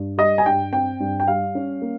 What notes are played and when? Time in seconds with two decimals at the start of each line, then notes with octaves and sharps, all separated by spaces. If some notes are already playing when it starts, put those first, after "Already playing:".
Already playing: G2
0.18 G3 D#5
0.38 G#5
0.46 G2 G5
0.73 C4 G5
1.00 G2
1.20 G5
1.28 G3 F5
1.55 C#4
1.82 A#3